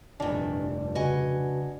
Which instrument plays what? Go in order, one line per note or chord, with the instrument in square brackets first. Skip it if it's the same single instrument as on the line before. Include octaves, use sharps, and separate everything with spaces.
[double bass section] F1 A#1 G2 [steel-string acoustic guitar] D#3 E3 [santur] D4
[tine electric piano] C#3 F#4 B4 [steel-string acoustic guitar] D#5 F#5 G#5